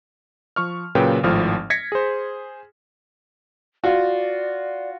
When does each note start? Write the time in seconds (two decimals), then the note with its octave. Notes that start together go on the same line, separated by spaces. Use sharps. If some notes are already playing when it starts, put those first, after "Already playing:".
0.56 F3 C#6 F6
0.95 A#2 C#3 F#3 B4 G5
1.23 G#1 A2 F3 F6
1.70 G#6 A#6 B6 C#7
1.92 G#4 C5
3.84 F4 F#4 D5